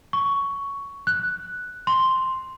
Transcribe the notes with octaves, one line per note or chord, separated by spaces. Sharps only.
C#6
F#6
C6